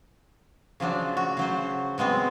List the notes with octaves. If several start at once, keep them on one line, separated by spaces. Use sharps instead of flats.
C#3 F3 F#3 D4
F#4
C#3 F#3 C5
F#3 G#3 B3 C4